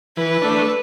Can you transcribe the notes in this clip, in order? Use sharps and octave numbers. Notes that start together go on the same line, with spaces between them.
E3 B4
A3 D4